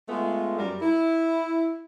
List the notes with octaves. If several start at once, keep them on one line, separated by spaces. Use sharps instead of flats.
G#3 A3 B3 F4
F#2 G3 A#4
E4